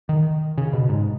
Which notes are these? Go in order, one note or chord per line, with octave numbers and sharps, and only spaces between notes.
D#3
C#3
B2
G#2